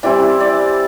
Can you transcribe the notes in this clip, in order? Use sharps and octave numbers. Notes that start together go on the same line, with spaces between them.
E3 G3 C4 E4 D5
D5